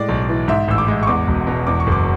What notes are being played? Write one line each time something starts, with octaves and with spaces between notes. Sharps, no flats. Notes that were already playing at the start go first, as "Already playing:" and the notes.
Already playing: A2 G#3 D5
B1
E3
G#2 E5
A1 E6
D6
G#3
C#6
E2 D6
E1
B2
E2 D6
C#6
F#1
D6